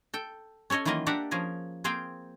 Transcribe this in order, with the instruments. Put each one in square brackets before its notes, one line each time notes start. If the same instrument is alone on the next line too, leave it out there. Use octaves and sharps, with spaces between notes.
[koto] A4 G5
C#4 A4 C#5 D#5 G#5
D#3 E3 F#3 A#3 F4 D#5
D4 G4 D5 E5 F#5 A#5
F3 C#4 G#4 A#4
A#3 C4 G#4 C5 F5 G5